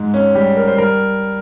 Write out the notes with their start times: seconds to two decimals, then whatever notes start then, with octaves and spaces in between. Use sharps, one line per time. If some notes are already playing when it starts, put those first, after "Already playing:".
Already playing: G#2 G#3
0.14 C#4
0.35 G3 G4
0.56 A#4
0.67 C5
0.77 G3 A#4